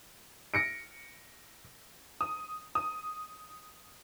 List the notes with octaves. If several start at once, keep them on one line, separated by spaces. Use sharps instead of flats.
A#6 C#7 D7
D#6
D#6